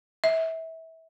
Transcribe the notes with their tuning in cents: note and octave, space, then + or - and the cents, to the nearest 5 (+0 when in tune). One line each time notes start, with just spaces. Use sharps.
E5 -25